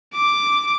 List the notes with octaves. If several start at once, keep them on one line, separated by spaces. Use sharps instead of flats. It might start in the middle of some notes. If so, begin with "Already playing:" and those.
D6